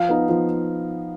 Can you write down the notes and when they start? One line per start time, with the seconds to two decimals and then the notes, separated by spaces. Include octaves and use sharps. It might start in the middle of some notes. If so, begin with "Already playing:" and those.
Already playing: F3 F5
0.09 B3 D#4
0.29 F3